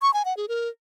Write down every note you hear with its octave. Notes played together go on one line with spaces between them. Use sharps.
C#6
G#5
F#5
G#4
A#4